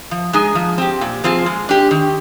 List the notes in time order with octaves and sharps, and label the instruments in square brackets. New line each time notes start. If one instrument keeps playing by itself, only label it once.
[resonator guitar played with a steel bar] F3
G#3 D#4 G#4
F3
C4 G4
A#2
F3 C4 F4 G#4
G#3
D4 G4
D#3